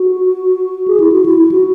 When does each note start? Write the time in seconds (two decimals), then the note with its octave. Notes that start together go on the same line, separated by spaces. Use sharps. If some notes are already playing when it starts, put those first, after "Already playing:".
Already playing: F#4
0.88 G#4
1.00 E4
1.12 F#4
1.26 E4
1.37 E4
1.51 F#4